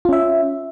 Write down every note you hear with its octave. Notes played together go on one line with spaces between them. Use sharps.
C#4 F4 E5